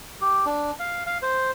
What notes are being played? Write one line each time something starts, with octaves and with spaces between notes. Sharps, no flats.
G4
D4
F5
F5
C5